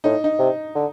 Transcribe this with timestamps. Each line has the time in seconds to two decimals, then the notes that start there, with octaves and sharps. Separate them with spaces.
0.04 A2 D#4
0.24 D#4
0.39 C3
0.75 D3